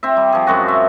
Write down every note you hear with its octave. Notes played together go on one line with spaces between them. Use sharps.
C4 E5
G3
F3 G#4
F#2 G#3 F#4 D#5
E5